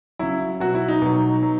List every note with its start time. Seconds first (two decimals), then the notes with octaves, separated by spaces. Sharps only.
0.19 C#3 F#3 E4
0.60 B2 F#3 F#4
0.75 E4
0.88 D#4
1.02 B2 F#3
1.43 F#3